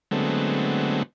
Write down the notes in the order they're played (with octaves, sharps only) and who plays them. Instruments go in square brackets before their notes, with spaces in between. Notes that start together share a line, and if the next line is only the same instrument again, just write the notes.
[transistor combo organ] D3 F#3 G#3 A3 B3 C4